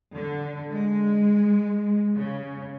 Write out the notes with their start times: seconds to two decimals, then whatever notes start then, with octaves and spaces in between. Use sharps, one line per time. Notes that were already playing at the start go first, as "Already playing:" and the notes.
0.15 D3
0.72 G#3
2.17 C#3